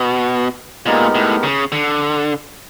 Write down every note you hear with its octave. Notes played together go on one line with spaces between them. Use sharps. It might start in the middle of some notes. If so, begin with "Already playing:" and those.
Already playing: B2
A#2 G#3 B3 D#4 G4 A#4
A2
C#3
D3